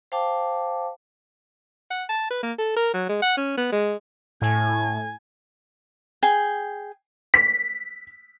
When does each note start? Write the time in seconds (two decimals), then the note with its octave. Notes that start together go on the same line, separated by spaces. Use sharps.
0.12 C5 F5 G5 A5 D6
1.90 F#5
2.09 A5
2.30 B4
2.43 A#3
2.58 A4
2.76 A#4
2.94 F#3
3.09 G#3
3.22 F#5
3.37 C#4
3.57 B3
3.72 G#3
4.42 A2 G#5
6.23 G#4 G5
7.34 B6